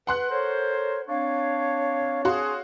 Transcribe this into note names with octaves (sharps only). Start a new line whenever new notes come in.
B4 F#5 C6 F#6
A4 A#4 C5 C#5
C4 D4 C#5 F5
F#4 G#4 F5 C6